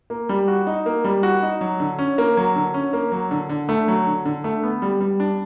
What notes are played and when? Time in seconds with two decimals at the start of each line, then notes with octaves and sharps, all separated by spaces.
0.10 A#3
0.29 G3
0.48 F#4
0.67 D#4
0.86 A#3
1.04 G3
1.23 F#4
1.42 D#4
1.61 F#3
1.80 D3
1.99 C#4
2.18 A#3
2.37 F#3
2.56 D3
2.74 C#4
2.93 A#3
3.12 F#3
3.31 D3
3.49 D3
3.69 A3
3.88 F#3
4.06 D3
4.25 D3
4.44 A3
4.63 B3
4.82 G3
5.00 G3
5.20 D4